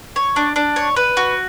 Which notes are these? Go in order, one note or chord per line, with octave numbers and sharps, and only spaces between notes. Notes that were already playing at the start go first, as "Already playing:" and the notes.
C#5
D4
D4
C#5
B4
F#4